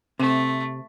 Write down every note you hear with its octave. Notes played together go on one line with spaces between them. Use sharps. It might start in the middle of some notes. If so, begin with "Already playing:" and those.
C3 A3